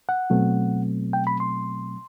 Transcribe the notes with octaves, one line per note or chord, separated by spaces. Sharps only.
F#5
B2 F#3 A3 C4
G5
B5
C6